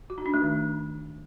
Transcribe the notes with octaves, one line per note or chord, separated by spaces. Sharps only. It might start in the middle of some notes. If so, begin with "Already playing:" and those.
F#4
D#4
D4
A3
D#3